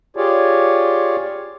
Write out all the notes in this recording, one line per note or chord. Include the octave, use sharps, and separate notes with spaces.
F4 G4 G#4 C#5 D5